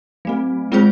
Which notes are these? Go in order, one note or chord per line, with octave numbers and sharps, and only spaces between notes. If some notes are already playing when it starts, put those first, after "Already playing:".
F#3 A3 C4
G#3 C4 F4 G#4 C5